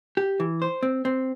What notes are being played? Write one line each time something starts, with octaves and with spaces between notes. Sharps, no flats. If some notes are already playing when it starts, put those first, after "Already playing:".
G4
E3
C5
C4
C4